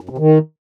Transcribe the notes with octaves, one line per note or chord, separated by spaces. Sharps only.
F#2
C3
D#3